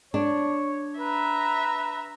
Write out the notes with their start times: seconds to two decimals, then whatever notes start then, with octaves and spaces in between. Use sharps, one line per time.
0.14 D4 C#5
0.99 B4 E5 A#5